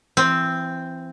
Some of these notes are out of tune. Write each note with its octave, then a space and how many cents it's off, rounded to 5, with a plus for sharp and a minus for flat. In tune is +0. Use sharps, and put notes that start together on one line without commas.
E3 +30 C4 +0